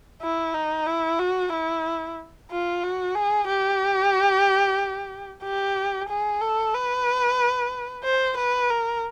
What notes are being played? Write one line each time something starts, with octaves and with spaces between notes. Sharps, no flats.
E4
D#4
E4
F#4
E4
F4
F#4
G#4
G4
G4
G#4
A4
B4
C5
B4
A#4